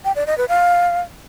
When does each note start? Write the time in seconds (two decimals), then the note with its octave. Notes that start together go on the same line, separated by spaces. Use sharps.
0.05 G5
0.16 D5
0.27 D#5
0.38 B4
0.49 F5